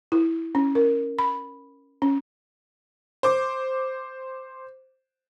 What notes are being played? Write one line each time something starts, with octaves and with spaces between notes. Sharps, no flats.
E4
C#4
A#4
B5
C#4
C5 D6